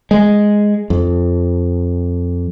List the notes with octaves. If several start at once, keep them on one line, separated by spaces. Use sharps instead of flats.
G#3
F2